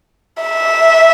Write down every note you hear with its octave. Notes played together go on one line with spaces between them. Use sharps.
E5